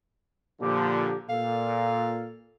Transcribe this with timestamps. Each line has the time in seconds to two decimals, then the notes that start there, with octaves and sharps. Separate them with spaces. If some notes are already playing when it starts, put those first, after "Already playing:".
0.61 A#2 D3 F3 G4
1.29 A#2 A4 F5